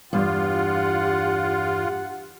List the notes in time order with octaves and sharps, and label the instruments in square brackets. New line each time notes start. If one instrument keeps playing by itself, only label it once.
[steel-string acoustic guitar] E2 G2 [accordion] F4 [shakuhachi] G4 [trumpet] F#5